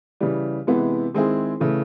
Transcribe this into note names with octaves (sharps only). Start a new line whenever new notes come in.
C#3 E3 G3
C3 E3 G#3 B3
D#3 G#3 C4 E4 G#4
C#3 E3 A3